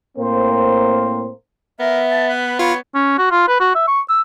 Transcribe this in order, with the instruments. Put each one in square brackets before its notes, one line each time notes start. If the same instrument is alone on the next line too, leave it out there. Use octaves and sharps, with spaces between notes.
[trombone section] A2 A#3 C4 A#4 C5
[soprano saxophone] B3 [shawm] A#4 [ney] E5
[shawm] A5
B4
[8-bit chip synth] F4 [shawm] C#5 [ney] B5
[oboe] C#4
F#4
F4
B4
F#4
E5
C#6
E6